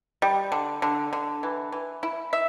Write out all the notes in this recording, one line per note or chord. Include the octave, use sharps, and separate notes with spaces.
G3
D3
D3
D3
E3
E3
E4
E5